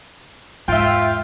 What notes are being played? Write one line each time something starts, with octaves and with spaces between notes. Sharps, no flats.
E2 G#2 F4 E5 G5